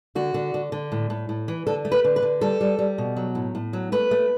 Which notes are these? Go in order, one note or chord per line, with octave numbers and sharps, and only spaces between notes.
D3 F#4
D3
D3
D3
A2
A2
A2
E3
D3 A4
A3
B4
D3
B4
D3
G3 A4
G3
G3
B2
F#3
A2
A2
F#3
A3 B4
A3